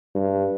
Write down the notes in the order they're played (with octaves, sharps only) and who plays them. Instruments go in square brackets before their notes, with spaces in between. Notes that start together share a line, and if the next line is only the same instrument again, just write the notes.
[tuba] G2